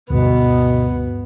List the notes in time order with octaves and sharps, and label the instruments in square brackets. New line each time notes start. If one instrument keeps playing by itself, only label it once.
[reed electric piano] D2 G2 [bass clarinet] B2 [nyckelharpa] B3